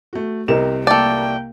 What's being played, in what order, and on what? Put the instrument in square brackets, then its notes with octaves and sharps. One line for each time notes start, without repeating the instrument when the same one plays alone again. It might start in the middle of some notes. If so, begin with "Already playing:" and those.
[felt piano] A3 F#4
[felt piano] C2 C3 E7 [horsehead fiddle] C4 [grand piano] G4 A#4 D#5
[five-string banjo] A3 D5 [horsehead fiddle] A#3 G5